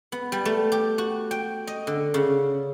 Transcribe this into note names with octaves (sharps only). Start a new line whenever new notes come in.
B3
G3
A3
G4
F#4
G5
D#5
D3
C#3